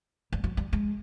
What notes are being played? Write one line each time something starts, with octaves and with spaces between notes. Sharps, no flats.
G3
F#3
G3
G#3